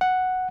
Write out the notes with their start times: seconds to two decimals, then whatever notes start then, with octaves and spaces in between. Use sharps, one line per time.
0.01 F#5